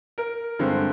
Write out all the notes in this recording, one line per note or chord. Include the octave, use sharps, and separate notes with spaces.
A#4
G2 D3 G#3 C4